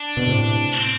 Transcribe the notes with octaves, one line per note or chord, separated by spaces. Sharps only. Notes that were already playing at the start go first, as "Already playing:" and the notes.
Already playing: D4
B2
A2 C3
C4